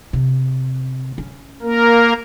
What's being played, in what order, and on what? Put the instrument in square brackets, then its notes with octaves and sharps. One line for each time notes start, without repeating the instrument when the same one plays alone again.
[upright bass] C3
C#4
[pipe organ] A#3 A#4